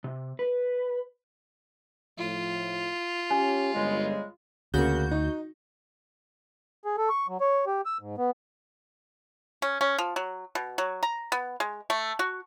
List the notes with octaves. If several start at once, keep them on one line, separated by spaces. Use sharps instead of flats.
C3
B4
A2 F3 F4
C#4 G4 G#5
G1 C#3 G3 G#3
D2 C#3 A#3 F#4 G6
D#4
G#4
A4
C#6
F#3
C#5
G4
E6
G#2
B3
C#4
C#4
F3
F#3
B2
F#3
A#5
B3
G#3
A3
F#4